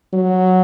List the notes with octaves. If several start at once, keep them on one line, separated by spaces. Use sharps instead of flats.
F#3